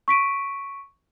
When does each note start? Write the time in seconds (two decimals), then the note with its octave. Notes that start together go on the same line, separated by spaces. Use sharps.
0.08 C#6 B6 D7 D#7